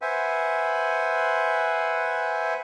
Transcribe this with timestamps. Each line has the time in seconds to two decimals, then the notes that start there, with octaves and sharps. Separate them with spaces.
0.02 B4 C5 E5 F#5 G#5